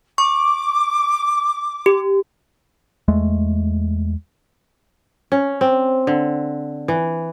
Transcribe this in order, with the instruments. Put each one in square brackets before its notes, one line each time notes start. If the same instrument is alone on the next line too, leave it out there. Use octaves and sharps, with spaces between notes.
[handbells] C#6 [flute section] D6
[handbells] G4
[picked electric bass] E2 G#3 A3
[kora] C#4
C4
D3
E3